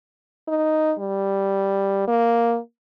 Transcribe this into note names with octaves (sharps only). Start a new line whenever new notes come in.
D#4
G3
A#3